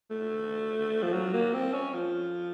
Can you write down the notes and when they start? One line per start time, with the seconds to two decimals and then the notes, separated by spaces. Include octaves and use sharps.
0.10 A3
1.03 F3
1.13 F#3
1.33 A#3
1.53 C4
1.73 C#4
1.94 F3